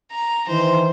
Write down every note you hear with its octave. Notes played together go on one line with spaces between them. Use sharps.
A#5
D#3 E3 C5